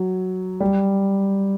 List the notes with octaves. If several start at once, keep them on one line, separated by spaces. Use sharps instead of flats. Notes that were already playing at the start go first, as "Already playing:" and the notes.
Already playing: F#3
G3